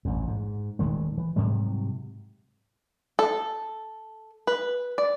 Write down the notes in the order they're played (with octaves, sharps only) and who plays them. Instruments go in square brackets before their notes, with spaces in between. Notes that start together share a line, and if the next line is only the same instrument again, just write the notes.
[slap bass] A1 F2
G#2
D#1 D#3 G#3 A3
E3
G#2 C3 F#3 G3
[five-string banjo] A4
B4
D5